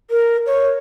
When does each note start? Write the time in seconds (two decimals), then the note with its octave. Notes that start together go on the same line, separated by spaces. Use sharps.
0.10 A#4
0.46 C#5